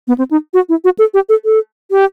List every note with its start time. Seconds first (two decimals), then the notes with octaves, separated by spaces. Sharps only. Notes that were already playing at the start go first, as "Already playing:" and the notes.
0.08 B3
0.18 C4
0.31 D#4
0.54 F#4
0.69 E4
0.84 F#4
0.99 A4
1.14 G4
1.29 A4
1.45 A4
1.91 G4